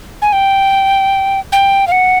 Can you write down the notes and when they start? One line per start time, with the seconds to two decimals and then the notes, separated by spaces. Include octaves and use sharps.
0.22 G#5
0.33 G5
1.52 G5
1.87 F5
1.92 F#5